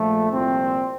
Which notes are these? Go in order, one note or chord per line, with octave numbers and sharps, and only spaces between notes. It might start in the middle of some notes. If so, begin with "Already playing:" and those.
Already playing: A#1 A#2 F3 A3
C2 A#2 F3 C4